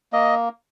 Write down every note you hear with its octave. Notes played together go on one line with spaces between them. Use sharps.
A#3 D#5